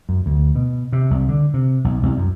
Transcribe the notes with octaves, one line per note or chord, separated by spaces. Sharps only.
F#2
D2
B2
C3
C2
D3
C3
B1
C2
F#2